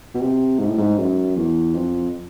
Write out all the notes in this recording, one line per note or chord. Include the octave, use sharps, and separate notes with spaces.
B2
C3
G#2
A2
G#2
F#2
E2
F2